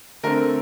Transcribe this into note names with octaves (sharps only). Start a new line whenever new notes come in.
D3 A3 C4 A#4